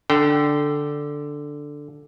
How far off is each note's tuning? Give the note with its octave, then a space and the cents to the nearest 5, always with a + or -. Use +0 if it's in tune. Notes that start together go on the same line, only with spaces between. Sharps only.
D3 +0 G5 -15